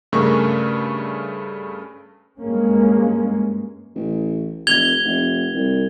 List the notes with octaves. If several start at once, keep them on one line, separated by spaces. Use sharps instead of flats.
G2 C#3 A3 C#4 A#4 C#6
G2 G#3 A#3 C#4
A1
F1 G#6 F7 G7
F1
C2